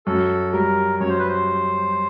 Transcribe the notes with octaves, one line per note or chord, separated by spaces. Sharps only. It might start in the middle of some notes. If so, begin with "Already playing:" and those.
F#2 A4
G3 A#4
F#2 C#5
C5
B4
C5